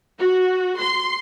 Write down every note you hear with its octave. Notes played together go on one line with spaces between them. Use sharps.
F#4
C6